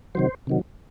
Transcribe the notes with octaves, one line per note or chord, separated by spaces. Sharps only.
C3 D#3 F#3 C5
C3 D#3 F#3